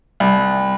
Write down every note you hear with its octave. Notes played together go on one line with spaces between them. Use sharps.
C2